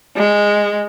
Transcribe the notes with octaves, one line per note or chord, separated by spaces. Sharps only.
G#3